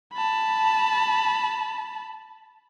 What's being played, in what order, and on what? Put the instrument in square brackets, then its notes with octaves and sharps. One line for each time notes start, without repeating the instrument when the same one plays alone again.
[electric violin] A5 B5